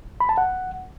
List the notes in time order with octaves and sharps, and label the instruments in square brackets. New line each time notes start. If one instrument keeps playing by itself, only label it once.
[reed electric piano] B5
A5
F#5